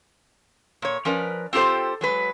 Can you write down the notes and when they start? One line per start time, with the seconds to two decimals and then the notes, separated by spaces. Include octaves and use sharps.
0.82 A#2 C#5
1.05 F3 C#4 A#4 B4 D5
1.53 C4 F4 G4 A4 C5
2.01 F#3 G#3 B4